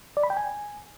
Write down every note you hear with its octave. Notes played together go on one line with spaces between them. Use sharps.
D5
B5
G5
G#5